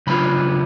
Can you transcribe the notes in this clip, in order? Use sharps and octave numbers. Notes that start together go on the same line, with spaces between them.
C#3 F#3 B3 D4 F4 B5